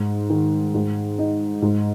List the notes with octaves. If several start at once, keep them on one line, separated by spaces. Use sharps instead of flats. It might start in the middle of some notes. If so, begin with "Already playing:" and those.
Already playing: G#2
D#3
G#2
D#4
G#2